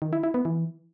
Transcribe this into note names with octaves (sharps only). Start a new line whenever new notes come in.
D#3
E4
E4
B3
E3